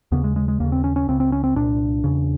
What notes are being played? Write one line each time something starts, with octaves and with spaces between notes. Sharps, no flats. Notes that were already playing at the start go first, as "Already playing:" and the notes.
D#2 C#3 B3
G#3
G#3
G#3
D#2 C#3 A#3
C4
C#4
C#4
C#2 C#3 C4
C4
C#4
C4
C2 A#2 D4
E2 C#3